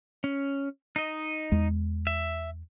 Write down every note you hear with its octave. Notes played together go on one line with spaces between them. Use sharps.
C#4
D#4 D#5
E2 G#3
E5